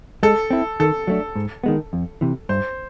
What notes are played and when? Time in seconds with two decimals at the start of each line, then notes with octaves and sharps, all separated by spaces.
0.23 G#3 A4
0.50 C4 E4
0.80 D#3 A4
1.07 F#3 A3 D4
1.35 G#2
1.64 D#3 G#3 B3
1.93 F2
2.21 C3 E3
2.49 G2 C5